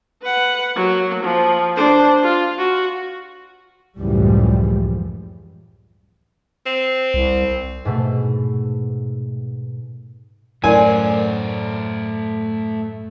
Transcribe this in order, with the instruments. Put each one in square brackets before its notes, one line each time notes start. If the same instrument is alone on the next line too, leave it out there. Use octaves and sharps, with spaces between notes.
[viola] B4 F#5
F#3 A#3
F3
D4 C5
F4
F#4
[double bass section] C#2 F#2 A2 E3 F3 G3
[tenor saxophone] C4
[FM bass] C2
[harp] G#2 B2 A3
[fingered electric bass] F#2 A2 [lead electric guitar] A3 C5 [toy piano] A#4 D5 [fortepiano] G#5